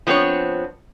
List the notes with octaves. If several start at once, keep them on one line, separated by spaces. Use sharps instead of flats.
F3 B3 C4 D4 C#5